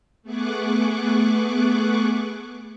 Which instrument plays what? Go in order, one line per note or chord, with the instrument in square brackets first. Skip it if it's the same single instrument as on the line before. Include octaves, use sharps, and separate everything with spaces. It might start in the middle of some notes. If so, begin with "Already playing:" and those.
[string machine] A3 B3 G#4 C#6 D6 F#6